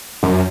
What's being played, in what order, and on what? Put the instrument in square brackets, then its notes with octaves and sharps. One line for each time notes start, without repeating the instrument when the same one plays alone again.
[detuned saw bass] F#2